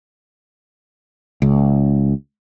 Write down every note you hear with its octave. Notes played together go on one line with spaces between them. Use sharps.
C#2